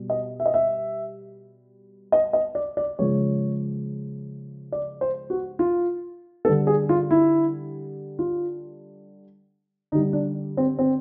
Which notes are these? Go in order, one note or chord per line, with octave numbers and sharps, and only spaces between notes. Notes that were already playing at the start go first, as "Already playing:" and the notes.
Already playing: B2 G3
D#5
E5
D#5
E5
D#5
D#5
D5
D5
C#3 F3 G#3 C#5
D5
C5
F#4
F4
D3 G3 A4
G#4
F4
E4
F4
D3 G3 D#4
D4
C4
C4